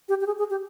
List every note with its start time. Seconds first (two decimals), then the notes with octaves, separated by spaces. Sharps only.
0.09 G4
0.21 G4
0.26 G#4
0.38 G#4
0.50 G4